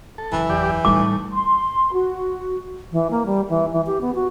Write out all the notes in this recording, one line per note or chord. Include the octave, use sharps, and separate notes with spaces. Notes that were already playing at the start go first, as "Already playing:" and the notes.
A4
F#1 E3
E2 G4 D5
A2 G3 D#4 D6
C6
F#4
E3
A#3
G3
E3
E3
G4
B3
F#4